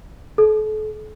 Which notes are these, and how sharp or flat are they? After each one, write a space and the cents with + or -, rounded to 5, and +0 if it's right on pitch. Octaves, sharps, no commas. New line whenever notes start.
A4 -35